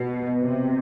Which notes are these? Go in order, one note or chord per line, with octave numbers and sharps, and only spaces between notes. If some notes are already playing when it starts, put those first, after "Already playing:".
Already playing: B2
C3